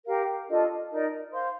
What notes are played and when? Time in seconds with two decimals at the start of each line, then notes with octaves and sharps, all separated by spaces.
0.06 G4 A#4 F5
0.48 D4 F4 A4 D#5
0.90 D#4 A#4 D5
1.32 C5 F5 C6